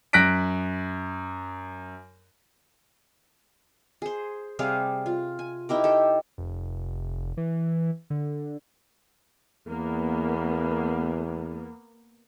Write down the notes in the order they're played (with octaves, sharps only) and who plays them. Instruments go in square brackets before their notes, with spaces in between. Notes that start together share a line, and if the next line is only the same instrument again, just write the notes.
[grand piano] F#2 F#6 A#6 B6 D7
[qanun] G#4 C5
C3 G3 G#4 F5
F4
G#5
D#4 E4 G4 A#4
G4 A4
[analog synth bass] F1
E3
D3
[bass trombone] E2 [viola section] A#3 B3